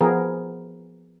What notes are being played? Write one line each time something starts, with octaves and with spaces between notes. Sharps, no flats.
F3 B3 G#4 A#4